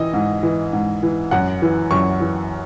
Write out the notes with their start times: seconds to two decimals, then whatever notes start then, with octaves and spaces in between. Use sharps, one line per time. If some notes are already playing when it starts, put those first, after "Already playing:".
Already playing: E3 D#5
0.14 G#2
0.43 E3
0.73 G#2
1.03 E3
1.31 F#2 F#5
1.62 E3
1.91 F#2 C#6
2.20 E3